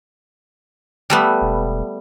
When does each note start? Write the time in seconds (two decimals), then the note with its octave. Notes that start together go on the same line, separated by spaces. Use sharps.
1.10 G3 A3 B3
1.42 E1